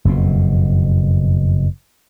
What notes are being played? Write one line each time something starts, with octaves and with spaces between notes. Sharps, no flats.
F#1 F2 G#2 B2